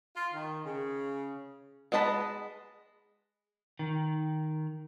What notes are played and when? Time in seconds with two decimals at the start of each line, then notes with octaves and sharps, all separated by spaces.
0.16 F4
0.34 D#3
0.66 C#3
1.92 G#3 B4 D#5 A5 B5
3.79 D#3